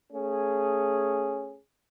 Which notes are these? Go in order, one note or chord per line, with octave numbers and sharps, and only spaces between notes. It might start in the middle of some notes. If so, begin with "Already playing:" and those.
A3 C#4 G#4